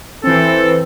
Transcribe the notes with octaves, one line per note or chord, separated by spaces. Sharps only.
E3 C4 A4